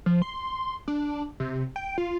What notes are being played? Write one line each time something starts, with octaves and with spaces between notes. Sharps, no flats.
F3
C6
D4
C3
G5
F4